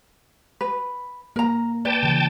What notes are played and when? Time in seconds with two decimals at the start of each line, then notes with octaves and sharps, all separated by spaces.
0.61 B4
1.36 A#3 A#4 A#5
1.85 B4 D5 G5 A5
2.03 C#3 E3